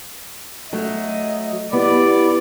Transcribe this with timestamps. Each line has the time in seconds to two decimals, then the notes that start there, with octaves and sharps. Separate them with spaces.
0.73 F#3 A3 D#5
1.73 B3 E4 G4 D5